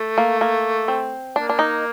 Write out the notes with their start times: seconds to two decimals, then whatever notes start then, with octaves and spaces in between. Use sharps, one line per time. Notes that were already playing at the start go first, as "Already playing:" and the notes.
Already playing: A3
0.18 A#3
0.41 A#3
0.88 C4
1.35 A#3 D4
1.49 D4
1.59 D#4